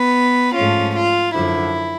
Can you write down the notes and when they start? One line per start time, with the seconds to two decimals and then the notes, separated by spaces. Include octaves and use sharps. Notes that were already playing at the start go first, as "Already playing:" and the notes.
Already playing: B3 B4
0.56 G#2 F3 A3 C#4 F4
0.96 F4
1.34 F#2 D3 F3 E4